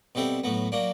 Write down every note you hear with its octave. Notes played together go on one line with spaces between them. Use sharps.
B2 G3 C4 E4 A4
A2 F#3 B3
F#3 A#3 D4